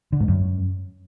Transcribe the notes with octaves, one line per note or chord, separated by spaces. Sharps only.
D3
G#2
F#2